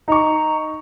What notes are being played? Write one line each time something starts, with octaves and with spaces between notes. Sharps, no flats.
D#4 A#5 C#6